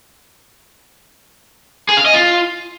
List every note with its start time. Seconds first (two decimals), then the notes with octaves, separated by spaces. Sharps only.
1.89 G#4
1.97 F5
2.05 D#5
2.14 F4